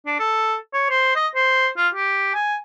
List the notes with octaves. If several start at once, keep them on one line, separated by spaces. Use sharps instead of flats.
D4
A4
C#5
C5
D#5
C5
F4
G4
G#5